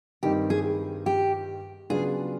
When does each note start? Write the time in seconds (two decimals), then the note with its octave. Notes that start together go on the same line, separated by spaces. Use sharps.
0.23 G2 D#3 G3 C4 D#4 G4
0.50 G#4
1.06 G4
1.90 C#3 F#3 B3 D4 F4 G#4